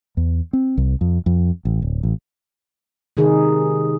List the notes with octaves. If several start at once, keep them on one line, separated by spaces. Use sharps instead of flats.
E2
C4
C2
F2
F2
A1
D1
A1
C3 D#3 D#4 G#4